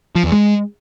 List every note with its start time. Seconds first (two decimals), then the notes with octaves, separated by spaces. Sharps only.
0.15 F3
0.24 E2
0.32 G#3